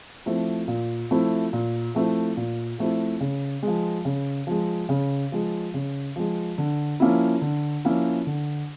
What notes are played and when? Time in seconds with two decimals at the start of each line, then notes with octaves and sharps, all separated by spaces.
0.26 F3 A3 C4 E4
0.68 A#2
1.11 F3 A3 C4 E4
1.53 A#2
1.95 F3 A3 C4 E4
2.37 A#2
2.79 F3 A3 C4 E4
3.20 C#3
3.63 F3 G#3
4.05 C#3
4.47 F3 G#3
4.89 C#3
5.32 F3 G#3
5.74 C#3
6.16 F3 G#3
6.58 D3
7.00 F3 A#3 C#4 E4
7.42 D3
7.85 F3 A#3 C#4 E4
8.27 D3